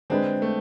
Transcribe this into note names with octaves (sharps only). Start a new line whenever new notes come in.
D3 G#3 C4 D4 G#4 B4
A3